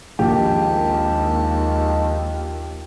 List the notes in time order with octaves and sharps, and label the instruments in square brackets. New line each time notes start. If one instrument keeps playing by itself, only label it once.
[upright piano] A#1 [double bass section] D#2 [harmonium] D#3 G#3 A5 [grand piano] G4